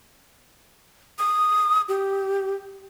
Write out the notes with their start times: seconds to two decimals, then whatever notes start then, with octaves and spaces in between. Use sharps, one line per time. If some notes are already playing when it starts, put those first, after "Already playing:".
1.19 D#6
1.89 G4